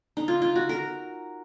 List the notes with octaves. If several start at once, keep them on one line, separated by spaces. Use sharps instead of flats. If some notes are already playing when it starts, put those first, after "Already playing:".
D#4
F4
F4
F#4
A#4